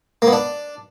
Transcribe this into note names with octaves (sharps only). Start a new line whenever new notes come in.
A#3
B3
D4